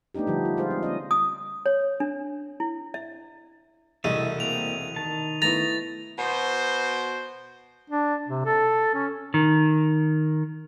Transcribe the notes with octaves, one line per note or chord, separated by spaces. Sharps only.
A3 B3 D4 D#4 G4
D3 F3 G3
F4
G#3 F4 G#4 C5
C4
A#3 C#4 D#5
D#6
C#5
D4
E4
E5
E1 C2 A3 D#5 E5 D#7
A#3 C4 F7
D#3 A5
A3 B3 E4 A#5 A6
B2 C5
D4
C3
A4
C#4
D#3